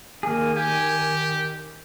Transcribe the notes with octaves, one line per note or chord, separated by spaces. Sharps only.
D#3 A#3 G#4
G4 G#5